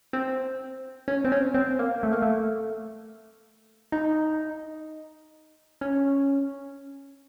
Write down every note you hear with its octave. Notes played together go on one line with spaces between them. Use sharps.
C4
C#4
C4
C#4
C4
A#3
A3
A#3
A3
D#4
C#4